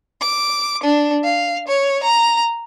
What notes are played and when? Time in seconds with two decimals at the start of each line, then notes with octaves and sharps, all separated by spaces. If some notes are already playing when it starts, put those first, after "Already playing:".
0.21 D6
0.84 D4
1.26 F5
1.68 C#5
2.03 A#5